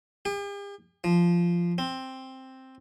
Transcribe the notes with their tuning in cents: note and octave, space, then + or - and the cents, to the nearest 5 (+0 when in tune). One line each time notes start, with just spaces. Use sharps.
G4 +45
F3 -10
C4 +5